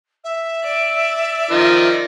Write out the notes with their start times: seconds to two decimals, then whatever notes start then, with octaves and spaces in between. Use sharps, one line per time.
0.24 E5
0.64 D5
1.51 D#3 F3 D#4